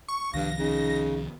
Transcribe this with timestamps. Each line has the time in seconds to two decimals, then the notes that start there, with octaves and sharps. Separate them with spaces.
0.08 C#6
0.34 C2 G2 D#3 F3 F5 A#6
0.59 C#3 D#4